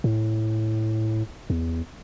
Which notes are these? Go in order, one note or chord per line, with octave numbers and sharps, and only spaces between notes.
A2
E2